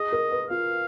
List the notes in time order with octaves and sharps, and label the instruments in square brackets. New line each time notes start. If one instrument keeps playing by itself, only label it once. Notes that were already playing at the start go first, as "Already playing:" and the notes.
Already playing: [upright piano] G#4 [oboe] D#5
[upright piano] A#4
B4
[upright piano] F4 [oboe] F5